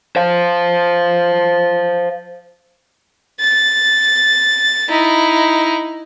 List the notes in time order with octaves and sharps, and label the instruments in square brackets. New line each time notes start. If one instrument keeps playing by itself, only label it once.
[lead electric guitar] C5 F5
[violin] A6
D#4 E4